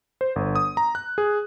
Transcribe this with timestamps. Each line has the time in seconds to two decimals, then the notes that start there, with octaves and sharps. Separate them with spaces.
0.21 C5
0.36 G1
0.56 D#6
0.77 A#5
0.95 F#6
1.18 G#4